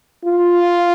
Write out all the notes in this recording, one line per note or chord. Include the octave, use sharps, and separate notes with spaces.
F4